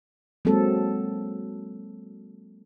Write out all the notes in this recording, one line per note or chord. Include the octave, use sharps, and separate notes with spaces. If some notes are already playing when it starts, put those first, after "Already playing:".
F#3 G#3 A#3 C4 A4